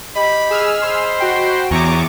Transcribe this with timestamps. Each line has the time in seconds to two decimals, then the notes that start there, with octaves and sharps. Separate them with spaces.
0.16 G4 D#5 B5
0.50 G#4 E6 F6
0.82 C5 B5 C6
1.20 F#4 G5
1.71 E2 C#5 G#5 A#5 C#6 D6